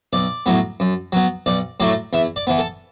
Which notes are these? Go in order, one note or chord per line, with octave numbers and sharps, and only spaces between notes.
B1 D5
A2 F#3 B3
F#2
F#3 B3
B1 D5
A2 F#3 A3 D5
E2 E5
D5
E3 B3
A4